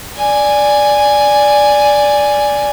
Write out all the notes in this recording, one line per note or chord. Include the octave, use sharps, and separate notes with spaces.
D5 G#5